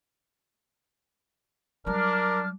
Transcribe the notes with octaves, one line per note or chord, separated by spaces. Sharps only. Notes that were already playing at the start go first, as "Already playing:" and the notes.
F#3 G3 D4 A#4 D6 F6